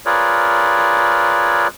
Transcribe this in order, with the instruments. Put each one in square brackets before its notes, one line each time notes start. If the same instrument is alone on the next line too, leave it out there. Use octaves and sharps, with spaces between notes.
[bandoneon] F4 G#4 A#4 B4 C#5 D5